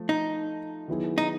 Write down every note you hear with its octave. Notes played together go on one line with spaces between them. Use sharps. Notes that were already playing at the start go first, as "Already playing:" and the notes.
Already playing: F3 A3
D#4
D#3 F#3 B3 E4 G#4
D#4